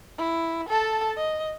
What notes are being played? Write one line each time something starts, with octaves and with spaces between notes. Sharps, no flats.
E4
A4 A5
D#5